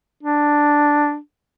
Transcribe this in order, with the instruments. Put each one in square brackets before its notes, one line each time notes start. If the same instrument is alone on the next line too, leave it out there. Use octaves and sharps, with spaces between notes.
[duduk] D4